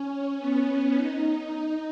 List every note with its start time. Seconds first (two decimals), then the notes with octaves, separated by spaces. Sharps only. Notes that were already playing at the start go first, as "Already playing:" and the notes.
Already playing: C#4
0.38 B3
0.95 D#4